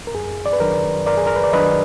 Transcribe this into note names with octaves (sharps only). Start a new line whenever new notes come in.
A#4
F#2 G#4
D5
B4
D#3 F#3 D4 A#4
F#2 A#4 D5
G#4
A#4
B4
D5
D#3 F#3 D4 B4 D#5